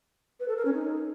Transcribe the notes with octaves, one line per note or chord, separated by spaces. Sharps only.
B4
A4
A#4
C#4
D#4